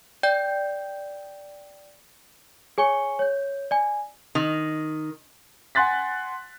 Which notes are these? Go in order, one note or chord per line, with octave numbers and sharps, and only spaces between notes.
D5 G5 G6
G#4 C#5 G#5 C#6 C#7 G7
C#5 G6
D5 G#5
D#3
F#5 G#5 C6 F#6 A6 B6